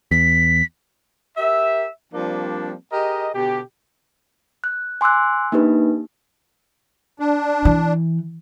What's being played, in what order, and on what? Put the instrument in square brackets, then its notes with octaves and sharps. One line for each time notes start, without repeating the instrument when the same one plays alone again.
[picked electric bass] E2 [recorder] B6
[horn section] G4 A#4 E5
F3 G3 A#3 C4 D4
G4 G#4 A#4 D#5
B2 D3 G4
[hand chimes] F#6
G#5 C6 D6 E6 F#6
A#3 D4 D#4 G4 B4
[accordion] D4
[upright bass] E3